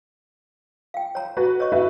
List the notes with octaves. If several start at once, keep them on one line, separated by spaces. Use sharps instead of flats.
F5 G5
C#5 A#5
F#4 B4
C#5 D#5 C#6
F#4 B4 E5